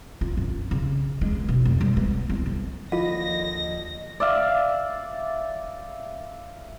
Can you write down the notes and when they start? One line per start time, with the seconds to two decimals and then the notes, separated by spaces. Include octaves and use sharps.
0.21 F4
0.37 F#2
0.71 C#3
1.21 G#3
1.35 C#2
1.48 B2
1.65 F1
1.81 G3
1.97 B3
2.29 C2
2.46 D3
2.92 D#2 D3 F3 F4 D#5 F5 A#6
4.20 D5 E5 F5